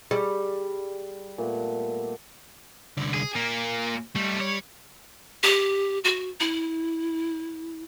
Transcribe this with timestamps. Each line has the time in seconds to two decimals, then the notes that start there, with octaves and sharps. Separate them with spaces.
0.11 G3 G#4
1.38 A#2 A3 B3
2.97 C2 D3
3.14 G#4
3.36 A#2 A#3
4.16 G#2 G3 A3
4.41 C#5
5.43 G4
6.04 F#4
6.40 E4